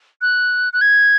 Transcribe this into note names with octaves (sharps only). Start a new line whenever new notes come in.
F#6
F#6
G#6